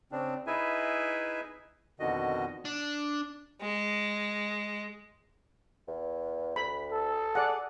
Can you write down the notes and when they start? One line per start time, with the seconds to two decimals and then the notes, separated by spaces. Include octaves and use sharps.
0.12 C#3 C4 D4
0.47 D#4 E4 G#4 B4 E5 G#5
2.00 F2 B2 D3 D#3 F#4 D#5
2.65 D4
3.61 G#3
5.88 E2
6.56 D2 B5
6.92 A4
7.35 G#4 D5 F#5